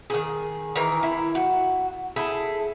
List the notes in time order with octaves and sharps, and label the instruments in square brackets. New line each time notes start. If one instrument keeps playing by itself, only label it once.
[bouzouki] D#3 G#4
D#3 E3 A#4
E4
F#4
E4 G#4 A4